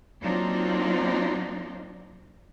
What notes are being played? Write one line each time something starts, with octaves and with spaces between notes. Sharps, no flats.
F#3 A#3 C4 D4 D#4 F4